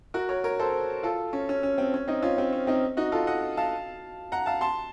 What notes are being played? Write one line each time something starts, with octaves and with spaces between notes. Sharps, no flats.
F#4 A#4
A#4 C#5
A#4 C#5
A4 C5
F4 A4
C#4
C#4
C#4
C4
C#4
C4 D#4
C#4 F4
C4
C#4
C4 D#4
D#4 F#4
F4 A4
D#5 F#5
F5 A5
F#5 A#5
F5 A5
A5 C6